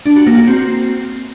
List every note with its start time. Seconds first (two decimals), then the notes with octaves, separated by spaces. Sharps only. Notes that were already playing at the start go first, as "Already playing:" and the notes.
0.06 D4
0.16 F#4
0.27 A#3
0.37 F#4
0.48 C4